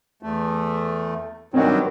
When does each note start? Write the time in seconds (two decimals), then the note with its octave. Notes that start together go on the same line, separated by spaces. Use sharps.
0.23 E2 A3
1.54 G2 D#3 F#3 C4 D#5 F#5